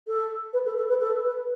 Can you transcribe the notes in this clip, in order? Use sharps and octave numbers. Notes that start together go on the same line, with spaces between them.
A4
B4
A4
A4
B4
A4
B4